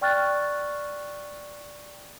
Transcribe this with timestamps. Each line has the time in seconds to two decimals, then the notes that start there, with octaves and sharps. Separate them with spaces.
0.01 D5 G5 C#6 F6 F#6 A6